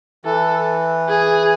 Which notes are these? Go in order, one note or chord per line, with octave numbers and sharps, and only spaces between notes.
E3 A4
G#4